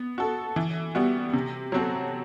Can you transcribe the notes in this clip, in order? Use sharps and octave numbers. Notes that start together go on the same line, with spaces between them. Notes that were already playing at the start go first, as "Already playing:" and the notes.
Already playing: B3
F#4 A4
E3
G3 B3 F#4
C3
F#3 C4 F#4 A4